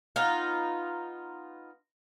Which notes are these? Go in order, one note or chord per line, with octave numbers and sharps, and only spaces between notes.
B3 D#4 F4